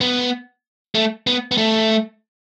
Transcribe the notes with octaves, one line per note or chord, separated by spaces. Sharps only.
B3
A3
B3
B3
A3